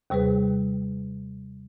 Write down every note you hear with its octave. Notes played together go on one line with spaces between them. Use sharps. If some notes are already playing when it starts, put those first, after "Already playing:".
D#2 C3 G3 G#4 B4